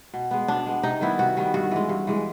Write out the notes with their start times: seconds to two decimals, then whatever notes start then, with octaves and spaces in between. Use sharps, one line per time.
0.14 B2
0.31 G#3 B3
0.48 B2 D4
0.66 G#3 B3
0.83 C3 D#4
1.01 D#3 G3 B3 E4
1.19 C3 F#4
1.37 D#3 G3 B3
1.54 G2 F#4
1.71 E3 G#3
1.89 G2
2.07 E3 G#3